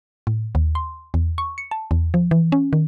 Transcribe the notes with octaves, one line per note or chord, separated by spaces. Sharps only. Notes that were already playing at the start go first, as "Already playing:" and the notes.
A2
D#2
C6
E2
C#6
C#7
A5
E2
F3
E3
C#4
D#3